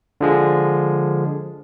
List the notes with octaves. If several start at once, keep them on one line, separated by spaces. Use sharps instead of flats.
D3 F3 G#3